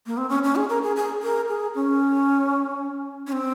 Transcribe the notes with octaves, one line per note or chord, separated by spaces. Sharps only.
A#3
C4
C#4
C#4
G#4
A#4
G#4
G#4
A#4
G#4
C#4
C#4
C4